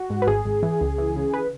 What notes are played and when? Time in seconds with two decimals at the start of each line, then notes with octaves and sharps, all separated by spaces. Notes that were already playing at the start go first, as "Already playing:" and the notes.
Already playing: F#4
0.10 G#2
0.22 B4
0.27 G#1 G#4
0.45 G#1
0.63 E3
0.81 C#2
0.98 E3
1.16 C#3
1.34 B4